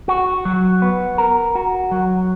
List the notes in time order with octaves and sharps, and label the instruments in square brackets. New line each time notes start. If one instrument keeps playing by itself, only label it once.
[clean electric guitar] F#4
F#3
B3
A#4
F#4
F#3